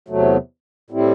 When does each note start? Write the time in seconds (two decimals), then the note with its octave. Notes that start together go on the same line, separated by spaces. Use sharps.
0.08 E2 C3 F#3 A3
0.90 A2 G3 C4 E4